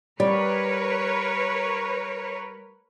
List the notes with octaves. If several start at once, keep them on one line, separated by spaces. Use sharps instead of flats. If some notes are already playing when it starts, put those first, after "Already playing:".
G3 A#4 B4 C#5